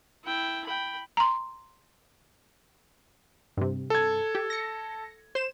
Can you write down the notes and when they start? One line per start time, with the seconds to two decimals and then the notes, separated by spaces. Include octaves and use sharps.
0.24 E4 G5
0.67 G5 B5
1.17 A#5 C6
3.57 G2 C3
3.90 A4 G#6
4.35 G4
4.50 A#6 C#7
5.35 C5 E7